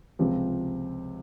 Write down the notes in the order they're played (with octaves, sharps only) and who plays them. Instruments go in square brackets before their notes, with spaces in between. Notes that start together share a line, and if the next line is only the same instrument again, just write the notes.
[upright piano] C#2 C3 F3 C4